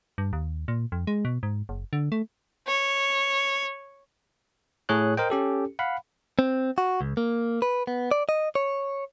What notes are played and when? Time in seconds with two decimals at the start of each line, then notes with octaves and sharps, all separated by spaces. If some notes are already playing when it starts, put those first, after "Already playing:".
0.18 G2
0.33 D#2
0.68 A#2
0.92 F2
1.07 G#3
1.25 B2
1.43 G#2
1.69 F#1
1.93 D3
2.12 A3
2.67 C#5
4.89 A2 G#4 C#5 F#6
5.17 A#4 C5 D#5 G5
5.30 C#4 G4 A4
5.79 F5 F#5 B5
6.39 C4
6.78 F#4
7.01 C#2
7.17 A#3
7.62 B4
7.87 B3
8.11 D5
8.29 D#5
8.55 C#5